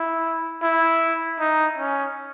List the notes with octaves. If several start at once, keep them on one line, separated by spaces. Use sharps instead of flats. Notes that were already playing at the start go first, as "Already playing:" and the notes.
Already playing: E4
E4
D#4
C#4